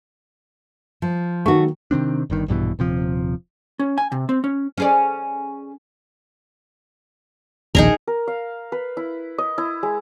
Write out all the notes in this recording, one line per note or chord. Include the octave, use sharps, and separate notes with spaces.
F3
D#3 F#3 A3 F#4 C#6
C3 D#3 C4 D4
G1 G2 D#3
A#1 G2 B2 E3
D#1 C3 F3
C#4
G#5
C3
C4
C#4
C#4 G#4 D5
D#1 A#1 D#4 G#4 A#4
A#4
F5
B4
E4
D#5
E4
G#3